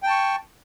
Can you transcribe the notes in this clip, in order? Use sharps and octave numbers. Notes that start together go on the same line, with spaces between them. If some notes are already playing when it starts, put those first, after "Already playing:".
G5 A5 C#6